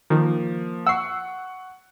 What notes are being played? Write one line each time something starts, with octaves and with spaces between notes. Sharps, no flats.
D#3 F3 A#3
F#5 C#6 E6 C7